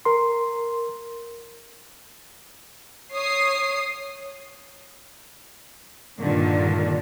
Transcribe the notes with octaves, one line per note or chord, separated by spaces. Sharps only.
A#4 C6
C#5 D#6 C7
G2 A#2 D3 D#3